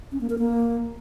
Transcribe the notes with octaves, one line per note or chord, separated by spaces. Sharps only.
C#4
A#3
A#4
A#3